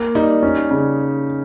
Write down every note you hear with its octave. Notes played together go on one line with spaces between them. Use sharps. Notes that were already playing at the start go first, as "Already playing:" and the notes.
Already playing: A#3
G3 D#4
C#4
C#3